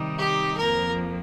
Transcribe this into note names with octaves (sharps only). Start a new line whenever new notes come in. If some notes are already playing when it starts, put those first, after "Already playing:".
Already playing: C3 D#3 G3 D#4
G4
F2 F3 A#3 A#4